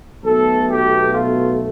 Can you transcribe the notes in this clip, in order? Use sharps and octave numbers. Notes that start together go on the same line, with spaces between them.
B1 B2 A3 A4
G4
F4